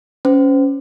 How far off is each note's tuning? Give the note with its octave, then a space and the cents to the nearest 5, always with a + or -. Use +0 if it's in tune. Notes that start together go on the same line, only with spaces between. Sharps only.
C#4 +0 C5 -35